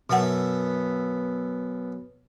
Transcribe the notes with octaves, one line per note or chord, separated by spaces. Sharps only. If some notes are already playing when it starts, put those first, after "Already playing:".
F#2 B2 B3 A4 E5 F#5